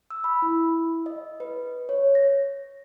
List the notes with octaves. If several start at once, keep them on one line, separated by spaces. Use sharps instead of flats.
E6
B5
E4
D#5
B4
C#5
A#6